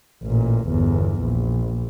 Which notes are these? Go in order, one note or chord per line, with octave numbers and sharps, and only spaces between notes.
A1 A#2
G1 E2
A#1